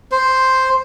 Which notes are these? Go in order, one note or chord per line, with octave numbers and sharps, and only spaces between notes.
C5